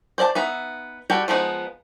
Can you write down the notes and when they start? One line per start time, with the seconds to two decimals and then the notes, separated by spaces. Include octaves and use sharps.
0.18 C5 D5 D#5 A5
0.35 B3 D#4 E5
1.10 G3 F#4 A4 G5
1.28 F3 G#3 B3 D#4